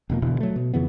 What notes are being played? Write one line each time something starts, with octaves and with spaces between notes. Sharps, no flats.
F1 B2 F3 A#3
E1 B2 D3 E3
F#3 A3
B2
F2 C#3 E3 B3